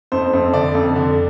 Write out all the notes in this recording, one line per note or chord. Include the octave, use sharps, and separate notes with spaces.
F2 C5
F2
D3 D5
F2
D3